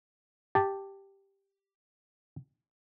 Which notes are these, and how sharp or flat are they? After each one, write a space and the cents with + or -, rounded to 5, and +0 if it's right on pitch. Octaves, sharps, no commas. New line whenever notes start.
G4 +0 A5 +0